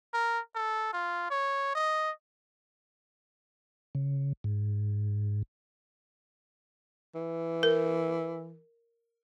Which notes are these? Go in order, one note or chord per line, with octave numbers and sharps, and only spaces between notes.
A#4
A4
F4
C#5
D#5
C#3
G#2
E3
A#4